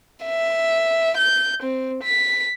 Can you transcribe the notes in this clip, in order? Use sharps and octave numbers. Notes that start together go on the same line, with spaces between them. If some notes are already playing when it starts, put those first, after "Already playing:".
E5
G6
C4
B6